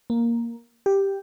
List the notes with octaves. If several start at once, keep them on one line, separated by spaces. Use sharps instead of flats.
A#3
G4